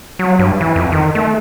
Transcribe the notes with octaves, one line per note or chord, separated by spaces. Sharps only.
F#3
G2
E3
F2
D#3
A3